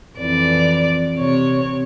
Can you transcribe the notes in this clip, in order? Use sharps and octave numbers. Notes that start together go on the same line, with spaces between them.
F2 E3 D5
C3 C#5